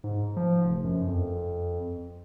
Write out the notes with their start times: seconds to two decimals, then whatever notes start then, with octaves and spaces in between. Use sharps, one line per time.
0.04 G#2
0.37 F3
0.64 F1
0.84 F#2
1.07 F2